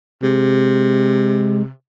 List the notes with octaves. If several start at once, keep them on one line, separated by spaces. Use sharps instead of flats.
C3 G#3